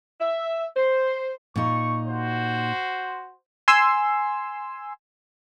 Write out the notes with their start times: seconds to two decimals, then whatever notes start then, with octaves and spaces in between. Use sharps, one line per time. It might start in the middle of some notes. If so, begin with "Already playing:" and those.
0.20 E5
0.76 C5
1.56 A#2 D#4 C#6
2.07 F#4 C5
3.68 G#5 C6 E6